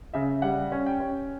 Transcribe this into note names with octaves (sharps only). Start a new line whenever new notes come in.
C#3 E5
G3 F#5
C#4
G5
C#4